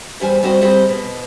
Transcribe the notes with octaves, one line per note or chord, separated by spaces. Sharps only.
E2 G3 C5 G#5
G3 C4 F#4 C5 D#5
G3 C4 G#4 D#5
B2